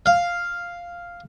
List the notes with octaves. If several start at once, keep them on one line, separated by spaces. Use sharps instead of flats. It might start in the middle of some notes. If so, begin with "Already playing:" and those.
F5